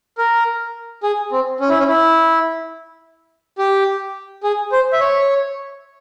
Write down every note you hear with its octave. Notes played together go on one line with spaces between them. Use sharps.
A#4
G#4
C4
C#4
E4
C#4
E4
G4
G#4
C5
E5
C#5